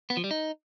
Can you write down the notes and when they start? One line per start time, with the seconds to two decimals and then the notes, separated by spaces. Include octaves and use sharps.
0.10 B3
0.17 F3
0.24 G3
0.31 D#4